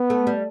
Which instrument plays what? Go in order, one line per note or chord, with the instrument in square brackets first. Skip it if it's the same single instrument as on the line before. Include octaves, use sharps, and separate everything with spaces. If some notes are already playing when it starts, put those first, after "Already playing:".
Already playing: [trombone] B3
[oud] A3
G3